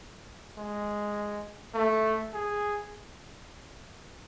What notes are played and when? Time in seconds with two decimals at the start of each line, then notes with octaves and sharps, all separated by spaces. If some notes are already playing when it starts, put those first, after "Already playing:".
0.58 G#3
1.74 A3
2.34 G#4